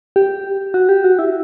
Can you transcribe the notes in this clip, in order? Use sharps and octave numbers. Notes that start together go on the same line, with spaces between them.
G4
F#4
G4
F#4
E4